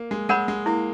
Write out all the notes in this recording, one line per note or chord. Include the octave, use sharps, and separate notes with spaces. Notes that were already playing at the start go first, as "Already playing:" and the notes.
Already playing: A#3
G#3
G#3 A#4 C#5 F#5 B5
G#3
A#3 E4